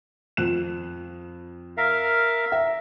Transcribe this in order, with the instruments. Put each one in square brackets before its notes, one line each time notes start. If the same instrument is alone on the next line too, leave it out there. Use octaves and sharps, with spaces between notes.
[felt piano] F2 F#6 E7
[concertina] A#4 E5 F5
[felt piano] E5